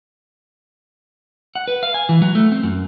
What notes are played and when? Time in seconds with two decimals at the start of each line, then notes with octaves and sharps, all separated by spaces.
1.55 F#5
1.68 B4
1.83 F5
1.94 G#5
2.09 E3
2.22 F#3
2.35 A3
2.52 C4
2.63 F#2